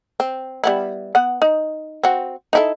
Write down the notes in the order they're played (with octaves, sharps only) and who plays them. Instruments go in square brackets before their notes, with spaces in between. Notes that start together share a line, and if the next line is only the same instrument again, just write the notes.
[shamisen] C4
G3 B3 E4
B3 F#5
D#4
C4 F#4
D#4 E4 A4